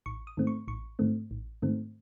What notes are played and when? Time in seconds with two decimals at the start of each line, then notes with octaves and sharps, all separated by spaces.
0.06 A1 C#6
0.27 D#6
0.37 G#2 D#3 A3 C4
0.47 C#6
0.68 A1 C#6
0.99 G#2 D#3 A3 C4
1.31 A1
1.62 G#2 D#3 A3 C4